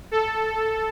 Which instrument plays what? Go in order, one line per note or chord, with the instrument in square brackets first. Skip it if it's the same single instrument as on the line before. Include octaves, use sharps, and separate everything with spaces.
[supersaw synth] A4